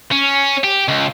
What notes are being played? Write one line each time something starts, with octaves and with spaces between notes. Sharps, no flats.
C#4
G4
C#2